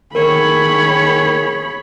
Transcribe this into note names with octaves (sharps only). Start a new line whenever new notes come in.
D#3 G#4 A#4 C#5 B5